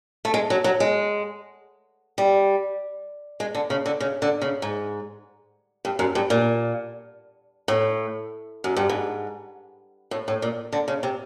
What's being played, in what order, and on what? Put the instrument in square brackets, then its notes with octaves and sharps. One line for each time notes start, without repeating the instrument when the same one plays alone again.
[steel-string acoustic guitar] A3
G#3
F#3
F#3
G#3
G3
G#3
D3
C#3
D3
C#3
D3
C#3
G#2
G2
F#2
G2
A#2
A2
F#2
G2
G#2
A2
A2
A#2
D3
C#3
C3